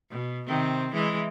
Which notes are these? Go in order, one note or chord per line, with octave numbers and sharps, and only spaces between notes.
B2
C3 D#3 C4
E3 G#3 E4